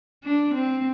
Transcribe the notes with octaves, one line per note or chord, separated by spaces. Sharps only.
D4
C4